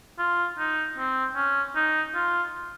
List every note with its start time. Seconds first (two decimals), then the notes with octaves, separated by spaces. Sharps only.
0.19 F4
0.58 D#4
0.97 C4
1.36 C#4
1.75 D#4
2.15 F4